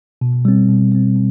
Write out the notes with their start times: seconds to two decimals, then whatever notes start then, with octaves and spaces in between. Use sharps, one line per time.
0.21 B2
0.45 G3 C4
0.69 B2
0.92 G3 C4
1.15 B2